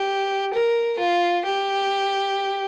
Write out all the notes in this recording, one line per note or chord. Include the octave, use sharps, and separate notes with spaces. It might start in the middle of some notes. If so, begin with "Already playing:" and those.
Already playing: G4
A#4
F4
G4